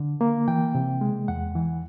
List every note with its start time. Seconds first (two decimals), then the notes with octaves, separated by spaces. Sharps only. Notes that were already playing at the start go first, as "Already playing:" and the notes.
Already playing: D3
0.21 A#3
0.48 E3 G5
0.75 C3
1.01 G#3
1.28 E2 F#5
1.55 E3